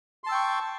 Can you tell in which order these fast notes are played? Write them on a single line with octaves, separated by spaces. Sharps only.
C6 A5 E6 G5 C#6